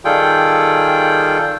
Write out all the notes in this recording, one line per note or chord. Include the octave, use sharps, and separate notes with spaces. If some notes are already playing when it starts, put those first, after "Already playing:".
D#3 G3 F4 G#4 A4 G5